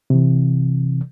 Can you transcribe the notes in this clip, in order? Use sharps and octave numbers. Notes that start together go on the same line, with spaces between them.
C3 E3